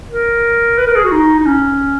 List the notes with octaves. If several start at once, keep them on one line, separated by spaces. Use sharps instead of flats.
A#4
B4
A#4
G#4
F#4
D#4
D#4
C#4